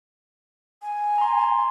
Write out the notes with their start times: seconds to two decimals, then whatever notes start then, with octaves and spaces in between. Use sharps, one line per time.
0.82 G#5
1.18 A#5 C6